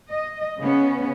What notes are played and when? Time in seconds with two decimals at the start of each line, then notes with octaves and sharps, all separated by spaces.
0.11 D#5
0.60 C#3 B3 C#4